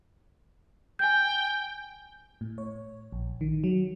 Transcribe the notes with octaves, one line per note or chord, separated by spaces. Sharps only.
G5 G#5 G6
A2
C#5
A#1
D#3
F#3